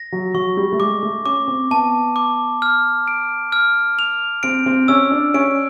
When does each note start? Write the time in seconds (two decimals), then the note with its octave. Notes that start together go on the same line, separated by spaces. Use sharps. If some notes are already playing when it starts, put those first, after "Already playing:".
Already playing: A#6
0.12 F#3
0.34 F#3 C#6
0.57 G3
0.72 A3
0.80 G#3 D6
1.03 A3
1.26 C#4 D6
1.48 C4
1.71 B3 A5
2.16 D6
2.62 F6
3.08 D7
3.52 F6
3.99 F7
4.43 C4 D7
4.66 C4
4.88 C#4 E6
5.11 D4
5.34 C#4 D7